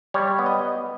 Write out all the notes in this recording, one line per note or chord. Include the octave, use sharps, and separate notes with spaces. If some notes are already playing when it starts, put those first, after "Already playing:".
G3 C#5
B3
D#5